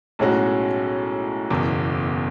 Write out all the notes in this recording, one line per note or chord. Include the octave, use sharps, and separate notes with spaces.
B1 A2 G#3 C#4 F#4
F#1 E2 B2